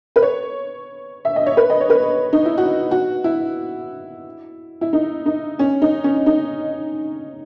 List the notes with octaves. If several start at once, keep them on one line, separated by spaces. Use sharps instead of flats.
B4
C#5
E5
D#5
C#5
B4
D#5
C#5
B4
D#4
E4
F#4
F#4
E4
E4
D#4
D#4
C#4
D#4
C#4
D#4